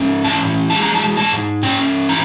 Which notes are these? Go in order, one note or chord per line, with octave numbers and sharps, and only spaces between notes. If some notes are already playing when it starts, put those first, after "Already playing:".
Already playing: G#2 C#4
E3 A5
G#3 A5
A#5
A5
G#2 A5
C#4 G5
E3 A#5